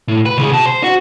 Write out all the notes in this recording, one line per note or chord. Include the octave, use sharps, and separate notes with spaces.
A2
B4
C#2 G#4
B2 A5
C5
F#4